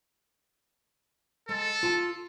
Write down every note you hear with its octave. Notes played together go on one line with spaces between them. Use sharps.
G#3 A4
F4 A5